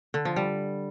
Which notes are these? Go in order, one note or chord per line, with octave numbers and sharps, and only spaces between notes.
D3
F3
G3